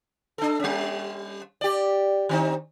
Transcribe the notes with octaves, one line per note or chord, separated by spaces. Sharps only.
D4 A4
G3 C#4
G4 D5
D#3 C4 D#4